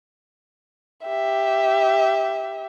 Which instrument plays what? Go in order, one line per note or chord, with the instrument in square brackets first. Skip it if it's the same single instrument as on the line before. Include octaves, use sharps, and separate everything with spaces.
[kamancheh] G4 E5